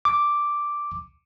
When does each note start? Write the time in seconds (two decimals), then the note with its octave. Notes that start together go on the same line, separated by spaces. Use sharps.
0.05 D6